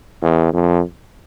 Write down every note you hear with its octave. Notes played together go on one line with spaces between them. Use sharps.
E2
F2